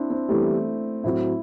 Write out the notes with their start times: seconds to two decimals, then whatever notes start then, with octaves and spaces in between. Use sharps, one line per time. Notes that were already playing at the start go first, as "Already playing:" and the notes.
Already playing: C4 D4 E4
0.10 C4
0.29 E3 G3 A3 B3 E4 G4
1.04 A2 F#3 C4 E4 F#4